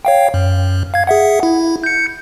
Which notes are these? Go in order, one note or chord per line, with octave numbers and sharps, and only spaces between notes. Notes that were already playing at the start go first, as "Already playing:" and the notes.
C#5 F5 G5
F#2
F5 G#6
G#4 E5 F#5
E4
G6 C#7